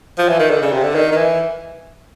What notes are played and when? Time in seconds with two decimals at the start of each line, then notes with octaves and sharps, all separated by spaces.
0.18 F3
0.28 E3
0.39 D#3
0.50 D3
0.62 C#3
0.72 C3
0.83 D3
0.95 D#3
1.12 D#3
1.17 E3